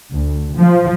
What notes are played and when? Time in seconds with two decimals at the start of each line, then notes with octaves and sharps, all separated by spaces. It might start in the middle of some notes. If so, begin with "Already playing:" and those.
0.13 D2
0.56 F3